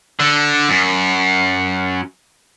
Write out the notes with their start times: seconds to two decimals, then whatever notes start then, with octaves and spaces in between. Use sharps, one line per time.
0.20 D3
0.69 F#2